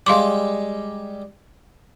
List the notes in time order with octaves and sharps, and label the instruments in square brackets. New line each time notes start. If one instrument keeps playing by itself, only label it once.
[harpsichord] G3 G#3 [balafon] F5 C6 D6